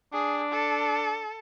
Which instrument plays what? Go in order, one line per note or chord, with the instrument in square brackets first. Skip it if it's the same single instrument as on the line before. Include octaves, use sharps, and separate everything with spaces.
[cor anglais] D4 [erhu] G#4
[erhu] A4